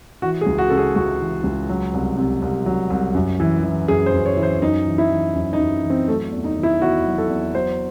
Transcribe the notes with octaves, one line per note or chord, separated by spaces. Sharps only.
E3 F#4
G#4
C#2
F#4
C#3 A4
G#4
C#2 F#4
E3
C#2
F#3
C2
C3
C2
F#3
C2
F#2
E3
E3
F#2 G#4
C5
F#2
C#5
E3
C5
F#2 D#4
E3
E4
E3
F#2
D#4
F#2
E3
C4
F#3 A3
E2
D#4
D#3
E4
E2 F#4
F#3
A4
E2
F#3 C5